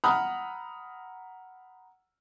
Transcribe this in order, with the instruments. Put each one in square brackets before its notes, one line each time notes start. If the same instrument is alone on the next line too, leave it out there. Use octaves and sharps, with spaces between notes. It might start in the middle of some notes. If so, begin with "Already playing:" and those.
[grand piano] F#5 A#5 B5 D#6 F6 F#6